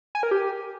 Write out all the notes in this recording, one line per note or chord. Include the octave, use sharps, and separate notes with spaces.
G#5
A#4
G4